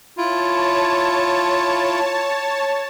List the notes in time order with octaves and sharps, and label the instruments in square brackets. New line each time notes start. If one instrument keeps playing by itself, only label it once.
[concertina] E4 F4 [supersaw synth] C#5 A5